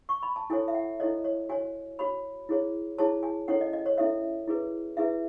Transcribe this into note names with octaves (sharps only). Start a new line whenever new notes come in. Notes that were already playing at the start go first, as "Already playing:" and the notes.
C#6
B5
A5
E4 A4 C#5 G#5
E5
F#5
E4 A4 C#5 D#5
C#5
F#4 C#5 G#5
F#4 C#5 B5
E4 G#4 C#5
E4 G#4 C#5 A5
G#5
C#4 E4 A4 C#5 F#5
D#5
D#5
C#5
C#4 E4 A4 C#5 E5
E4 G#4 B4
E4 G#4 B4 E5